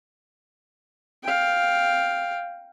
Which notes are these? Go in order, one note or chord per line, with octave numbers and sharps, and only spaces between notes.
F5 G5